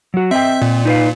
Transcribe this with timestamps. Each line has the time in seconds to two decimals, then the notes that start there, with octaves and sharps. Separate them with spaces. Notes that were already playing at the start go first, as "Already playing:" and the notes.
0.14 F#3 F#4
0.31 C4 D#5 E5 G5
0.62 A#2
0.85 D#4 B4 F5